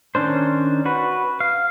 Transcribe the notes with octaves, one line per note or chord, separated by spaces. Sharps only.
D#3 C#4 D4 C5
F#4 B4
F5